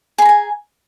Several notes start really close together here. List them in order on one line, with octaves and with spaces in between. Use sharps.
G#4 B5 A#5 G#5